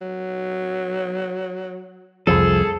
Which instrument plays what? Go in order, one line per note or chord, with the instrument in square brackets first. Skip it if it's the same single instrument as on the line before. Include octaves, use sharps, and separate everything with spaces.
[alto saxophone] F#3
[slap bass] C2 F2 F3 [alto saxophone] G#4 [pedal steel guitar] A4